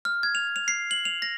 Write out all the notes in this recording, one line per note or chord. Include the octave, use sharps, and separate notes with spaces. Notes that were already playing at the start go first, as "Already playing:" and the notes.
F6
G#6
F7
F7
C7
F#7
F7
A#6